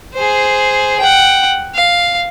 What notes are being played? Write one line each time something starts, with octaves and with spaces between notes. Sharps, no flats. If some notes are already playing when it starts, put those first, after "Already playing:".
G#4 C5
F#5 G5
F5